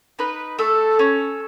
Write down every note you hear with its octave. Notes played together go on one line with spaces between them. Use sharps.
D#4 B4
A3 A4
C#4